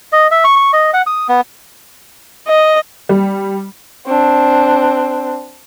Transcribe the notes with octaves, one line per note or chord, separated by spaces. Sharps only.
D#5
E5
C#6
C#6
D#5
F#5
D#6
B3
D#5
G3
C4 D4